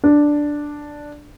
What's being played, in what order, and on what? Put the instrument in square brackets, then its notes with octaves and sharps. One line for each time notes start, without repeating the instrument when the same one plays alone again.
[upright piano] D4